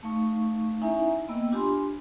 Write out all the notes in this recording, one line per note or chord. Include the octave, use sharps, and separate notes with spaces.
A3 D#4 F5 C#6
C#4 D#4 E4 E5 G#5 A#5
A#3 B3 D#5 G5 E6
D4 F4 G4 G#5 B5 C6